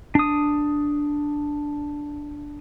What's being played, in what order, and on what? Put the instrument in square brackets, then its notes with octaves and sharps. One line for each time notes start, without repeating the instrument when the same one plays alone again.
[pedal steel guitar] D4 D#6